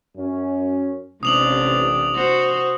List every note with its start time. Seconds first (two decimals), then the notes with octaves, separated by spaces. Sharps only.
0.16 F#2 C#4
1.23 A1 C3 D4 D#6 F7 F#7
2.15 F#4 C5